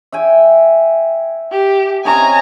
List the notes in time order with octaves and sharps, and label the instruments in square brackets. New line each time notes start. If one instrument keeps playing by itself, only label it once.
[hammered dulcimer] E5 G5 G#5
[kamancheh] G4
[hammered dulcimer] C3 C#4 D#4 [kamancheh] G#5 A#5